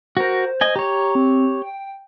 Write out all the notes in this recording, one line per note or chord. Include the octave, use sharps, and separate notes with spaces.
F#4 A#4 C5
D#5 G#5
G4 C#5 A#5
C4
G5